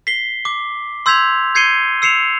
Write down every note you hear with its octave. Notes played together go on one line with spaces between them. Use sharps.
B6 C7 G7
D6
C6 E6 G6 G#6 B6 F7
G6 G#6 C7 C#7 D#7 G7
E6 C7 C#7 E7 F7